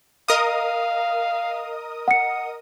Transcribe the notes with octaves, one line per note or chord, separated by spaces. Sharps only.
A#4 D#5 F5 D#6
F#5 C#7